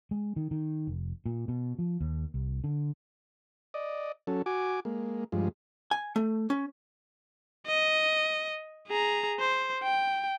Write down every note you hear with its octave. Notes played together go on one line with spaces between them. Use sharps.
G#3
D#3
D#3
F1
A#2
B2
F3
D#2
C2
D3
D5 D#5
F#3 C#4 A4
F#4 G#5 D6
G#3 A#3
G2 F3 G#3
G#5
A3
C#4
D#5
G#4 A#5
C5
G5